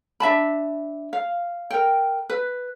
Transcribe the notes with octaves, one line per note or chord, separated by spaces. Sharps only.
D4 E5 A5 B5
F5
A#4 G5
B4